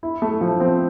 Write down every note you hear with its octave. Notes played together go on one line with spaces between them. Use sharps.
E4
A3
F3
C4